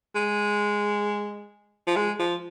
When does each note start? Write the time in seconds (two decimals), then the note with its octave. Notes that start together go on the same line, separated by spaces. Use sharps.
0.15 G#3
1.87 F3
1.96 G#3
2.19 F3